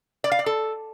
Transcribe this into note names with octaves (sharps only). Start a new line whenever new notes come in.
D5
F5
D5
A4